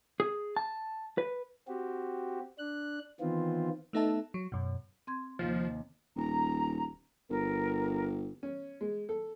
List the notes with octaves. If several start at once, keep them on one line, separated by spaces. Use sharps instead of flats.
G#4
A5
B4
C4 F#4 G4
D4 F#6
D#3 E3 B3 C4 F4
A3 B3 D#4 A4 E5 A5
F#3
F#2 B2
C4 C6 G#6
D#2 C3 F3
D#1 A#5
G1 A#4
C#4
G#3
A4